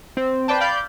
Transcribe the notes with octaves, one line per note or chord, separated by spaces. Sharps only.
C4
B4 C5 D5 G5 A5
D5 F5 B5 G6